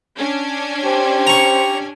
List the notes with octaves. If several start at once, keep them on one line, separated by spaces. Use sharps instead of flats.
C#4 D4 G#5
G4 C5
A#5 C#6